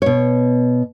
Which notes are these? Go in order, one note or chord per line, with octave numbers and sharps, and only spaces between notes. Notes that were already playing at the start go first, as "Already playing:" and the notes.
B2 C#5